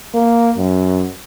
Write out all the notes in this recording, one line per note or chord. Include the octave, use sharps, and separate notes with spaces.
A#3
F#2